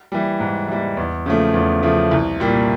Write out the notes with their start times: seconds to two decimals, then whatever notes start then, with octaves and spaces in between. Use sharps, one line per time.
0.12 E3 G3
0.40 G#2
0.68 E3 G3
0.97 E2
1.26 C#3 F3 A3
1.54 E2
1.82 C#3 F3 A3
2.11 C2
2.40 A#2 G3